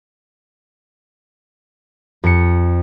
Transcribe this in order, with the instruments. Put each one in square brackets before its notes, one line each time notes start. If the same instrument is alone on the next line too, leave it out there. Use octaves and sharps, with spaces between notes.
[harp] F2 C#7